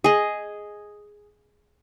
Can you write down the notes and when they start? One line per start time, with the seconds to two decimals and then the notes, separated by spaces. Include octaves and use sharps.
0.04 G#4 D#5